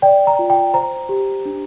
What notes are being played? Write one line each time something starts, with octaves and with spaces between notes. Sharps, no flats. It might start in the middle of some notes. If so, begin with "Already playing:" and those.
D5 G5
A#5
F4
G5
C5 A#5
G4
D4